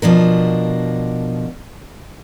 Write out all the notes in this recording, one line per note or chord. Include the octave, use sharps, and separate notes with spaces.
B2 F3 D4 A#4